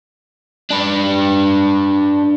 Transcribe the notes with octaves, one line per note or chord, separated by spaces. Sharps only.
D4 B4